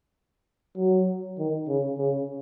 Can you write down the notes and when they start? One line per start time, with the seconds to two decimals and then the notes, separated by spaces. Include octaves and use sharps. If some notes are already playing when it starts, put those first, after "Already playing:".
0.77 F#3
1.39 D#3
1.68 C#3
1.98 C#3